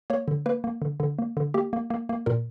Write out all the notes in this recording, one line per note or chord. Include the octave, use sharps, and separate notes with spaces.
A#3 C#5
D3
A#3 B4
A#3
D3
D3
A#3
D3
A#3 G4
A#3
A#3
A#3
A#2 A#4